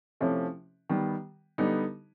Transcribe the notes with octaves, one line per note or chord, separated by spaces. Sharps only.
C3 F3 A3 C#4 E4
D#3 G3 B3
D3 G3 B3 D#4